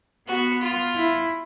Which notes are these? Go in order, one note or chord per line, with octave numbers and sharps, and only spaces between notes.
B3 F#4
F4
E4